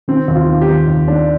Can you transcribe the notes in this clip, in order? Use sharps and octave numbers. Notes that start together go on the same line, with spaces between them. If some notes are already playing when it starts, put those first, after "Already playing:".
D#3 C4
D#2
F4
D#3
G4
D#3
D#2
D#3 D4